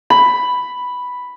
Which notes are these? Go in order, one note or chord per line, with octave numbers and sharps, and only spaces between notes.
B5